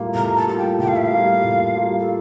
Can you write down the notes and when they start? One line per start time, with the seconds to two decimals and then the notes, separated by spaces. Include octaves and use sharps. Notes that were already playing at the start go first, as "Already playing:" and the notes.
Already playing: A2 G3 A#3 F4
0.15 A2 A#5
0.36 A5
0.47 G3 A#3 F4 A5
0.58 G5
0.79 A2 G5
0.88 F5
0.96 E5
1.05 F5
1.11 G3 A#3 F4
1.44 A2
1.76 G3 A#3 F4
2.00 A4